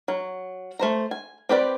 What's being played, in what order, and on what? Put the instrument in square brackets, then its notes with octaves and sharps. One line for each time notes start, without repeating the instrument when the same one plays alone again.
[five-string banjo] F#3
A3 C5 A#5
G#5
C4 G4 B4 D5